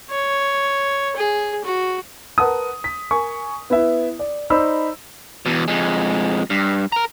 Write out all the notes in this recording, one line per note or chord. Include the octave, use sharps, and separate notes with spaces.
C#5
G#4
F#4
A#4 B4 F#5 A5 D#6
B6
A#4 G#5 C#6
B3 E4 B4 E5
D5
D#4 C5 D5 B5 E6
E2 B2
F2 G#3
G2
A#4 A#5